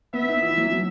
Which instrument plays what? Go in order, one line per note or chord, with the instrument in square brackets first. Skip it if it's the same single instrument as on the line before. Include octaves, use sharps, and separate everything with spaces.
[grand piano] B3 [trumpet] E5
[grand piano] D#4
E3
F#3
F#3